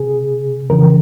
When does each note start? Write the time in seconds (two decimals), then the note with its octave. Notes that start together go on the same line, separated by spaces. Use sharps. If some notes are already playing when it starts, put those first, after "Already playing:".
Already playing: C3 G#4
0.70 F2 C#3 E3 A#4